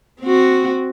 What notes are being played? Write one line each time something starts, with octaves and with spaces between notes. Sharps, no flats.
C4 F#4